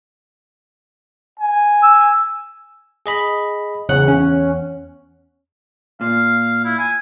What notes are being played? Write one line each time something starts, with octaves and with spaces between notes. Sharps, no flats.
G#5
E6
G#4 D#5 B5
E2 C#3 F#5 F#6
C#4
A#2 F5
E4
G#5